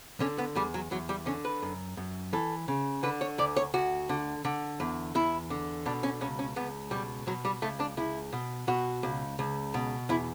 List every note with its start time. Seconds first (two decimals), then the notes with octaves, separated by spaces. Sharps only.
0.20 D3 C#4
0.38 B3
0.55 E2 G3
0.74 F#3
0.91 E2 F#3
1.09 G3
1.26 D3 C#4
1.45 B4
1.62 F#2
1.97 F#2
2.33 E3 A4
2.68 C#3
3.03 D3 B4
3.21 C#5
3.38 D2 D5
3.56 C#5
3.74 D2 F#4
4.09 D3
4.45 D3
4.80 E2
5.15 E2 E4
5.50 D3
5.86 B2 D4
6.03 C#4
6.21 C#2 C#4
6.39 C#4
6.56 C#2 B3
6.91 B2 G3
7.27 B2 F#3
7.45 G3
7.62 C#2 A3
7.80 D4
7.97 C#2 E4
8.33 B2
8.68 B2 F#4
9.03 C#2
9.39 C#2
9.74 B2
10.09 E2 E4